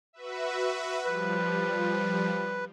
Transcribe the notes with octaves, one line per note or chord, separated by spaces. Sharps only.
F#4 B4 E5
F3 G3 B4